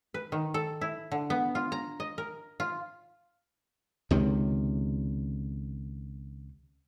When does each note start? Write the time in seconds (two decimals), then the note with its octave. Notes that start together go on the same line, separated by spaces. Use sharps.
0.14 B4
0.32 D#3
0.54 A4
0.81 E4
1.11 D3
1.30 B3
1.55 F4
1.72 A#5
2.00 D#5
2.18 A#4
2.60 F4
4.11 C#2 C3 D#3